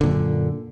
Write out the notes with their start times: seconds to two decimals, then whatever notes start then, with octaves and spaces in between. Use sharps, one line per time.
0.01 D3
0.03 A#2
0.06 F#2